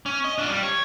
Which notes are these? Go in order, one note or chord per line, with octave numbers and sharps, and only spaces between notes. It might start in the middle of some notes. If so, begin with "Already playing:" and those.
C#4
D#5
D4 F4
G3
C#5